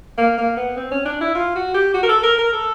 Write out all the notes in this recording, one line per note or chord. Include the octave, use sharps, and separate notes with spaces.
A#3
A#3
B3
C4
C#4
D4
E4
F4
F#4
G4
F#4
A#4
A4
A#4
A#4
A4